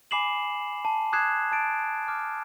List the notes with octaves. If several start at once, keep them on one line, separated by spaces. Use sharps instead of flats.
G#5 B5 D6 C7 E7 F#7
A5
D6 D#6 F#6 G#6 C7 E7
A5 A6 D7
D6 F6